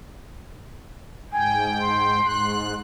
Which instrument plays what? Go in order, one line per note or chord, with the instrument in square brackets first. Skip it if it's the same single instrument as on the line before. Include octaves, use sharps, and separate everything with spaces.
[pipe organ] G#2 G5 [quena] G#5
[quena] C6
[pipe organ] G#2 F#6